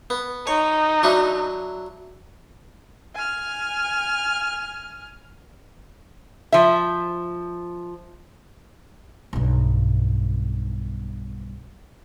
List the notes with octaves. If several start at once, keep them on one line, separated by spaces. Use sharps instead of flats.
B3
D#4 C#5
F#3 D4 E4
G#5 F6
F3 E5
B1 G2